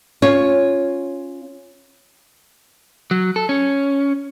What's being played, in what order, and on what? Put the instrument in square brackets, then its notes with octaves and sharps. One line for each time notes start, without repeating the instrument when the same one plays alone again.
[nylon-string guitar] C#4 F4 C#5
[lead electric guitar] F#3
A4
C#4